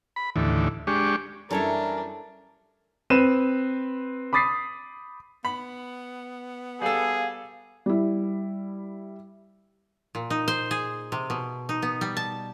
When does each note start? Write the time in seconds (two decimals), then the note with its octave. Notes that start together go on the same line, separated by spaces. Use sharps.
0.16 B5
0.36 D#2 A2 D3 E3
0.87 G#3 D4 G4 C#6
1.50 F#2 E3 G3 D4 A4 A#4 C#5 E5
3.10 C4 B4 D#7 E7
4.33 B5 D6 D#6 A6 B6 C7
5.45 B3 B5
6.82 G3 G#4 A4 F5
7.86 G3 E4
10.15 A#2
10.30 D#4
10.48 C5
10.71 G#4
11.12 C3
11.30 B2
11.69 D#4
11.82 B3
12.01 G3
12.17 A5